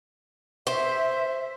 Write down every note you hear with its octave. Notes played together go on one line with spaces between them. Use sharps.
C5 E5